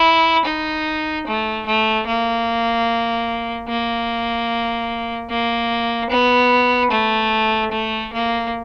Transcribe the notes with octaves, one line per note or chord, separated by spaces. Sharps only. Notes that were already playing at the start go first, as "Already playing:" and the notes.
Already playing: E4
D#4
A3
A3
A#3
A#3
A#3
B3
A3
A3
A#3